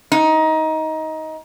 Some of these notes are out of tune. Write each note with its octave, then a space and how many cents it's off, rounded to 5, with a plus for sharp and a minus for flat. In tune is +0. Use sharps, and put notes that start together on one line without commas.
D#4 +20